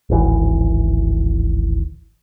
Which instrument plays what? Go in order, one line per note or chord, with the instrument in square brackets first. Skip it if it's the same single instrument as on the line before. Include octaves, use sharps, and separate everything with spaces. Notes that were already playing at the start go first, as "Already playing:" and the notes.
[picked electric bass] D1 G#1 E3